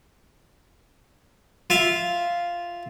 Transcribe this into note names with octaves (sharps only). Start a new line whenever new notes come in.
F4 E5 F5